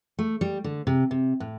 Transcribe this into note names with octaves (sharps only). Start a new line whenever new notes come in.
A3
G3
D3
C3
C3
A2